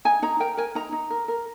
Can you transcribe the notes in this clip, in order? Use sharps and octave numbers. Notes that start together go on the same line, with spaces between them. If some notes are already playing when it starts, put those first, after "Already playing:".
D#4 G#5
D#4 A#5
A#4 G5
A#4 G#5
D#4 A#5
D#4
A#4
A#4